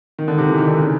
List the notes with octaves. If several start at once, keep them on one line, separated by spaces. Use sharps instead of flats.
D#3
D3
C3
E3
D#3
D3
C#3